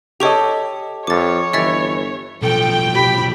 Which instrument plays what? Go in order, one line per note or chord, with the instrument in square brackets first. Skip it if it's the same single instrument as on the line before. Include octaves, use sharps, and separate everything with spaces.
[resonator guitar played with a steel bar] G4 A4 D#5 [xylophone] C#5 C#6 F7
[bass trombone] F2 [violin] C#5 [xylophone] D6 A6
[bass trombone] G1 [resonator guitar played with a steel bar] E3 [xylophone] D#5 E5 A6
[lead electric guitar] B1 F3 [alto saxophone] A4 [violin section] G5
[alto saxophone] G4 [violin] B5